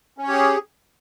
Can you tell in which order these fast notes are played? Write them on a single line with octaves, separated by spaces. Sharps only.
C#4 C#5 G4 G#4